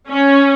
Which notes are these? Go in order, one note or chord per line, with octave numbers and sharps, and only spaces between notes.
C#4